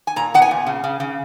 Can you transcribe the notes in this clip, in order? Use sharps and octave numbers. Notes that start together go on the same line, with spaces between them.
G#5
A#2 A#5
B3 F#5
G#5
A#2
C#3
C#3
C#3